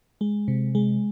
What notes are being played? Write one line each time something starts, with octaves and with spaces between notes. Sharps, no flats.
G#3
C3
G#3